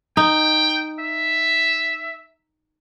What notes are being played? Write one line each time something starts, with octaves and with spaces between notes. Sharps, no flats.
D#4 G5
E5